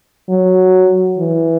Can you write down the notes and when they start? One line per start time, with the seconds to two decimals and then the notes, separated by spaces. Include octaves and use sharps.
0.29 F#3
1.18 E3